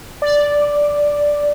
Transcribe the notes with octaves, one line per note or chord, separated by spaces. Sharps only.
D5